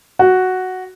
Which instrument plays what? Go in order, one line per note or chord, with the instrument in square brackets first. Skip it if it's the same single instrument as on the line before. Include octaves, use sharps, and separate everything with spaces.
[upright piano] F#4